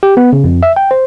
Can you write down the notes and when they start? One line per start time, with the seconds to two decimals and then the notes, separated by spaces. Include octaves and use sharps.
0.03 G4
0.17 B3
0.33 C#3
0.44 F2
0.63 E5
0.76 G5
0.91 C5